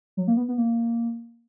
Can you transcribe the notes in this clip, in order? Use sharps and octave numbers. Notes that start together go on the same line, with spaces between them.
F#3
A#3
B3
B3
A#3